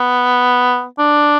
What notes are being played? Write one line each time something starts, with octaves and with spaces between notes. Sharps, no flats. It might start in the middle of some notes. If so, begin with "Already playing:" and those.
Already playing: B3
D4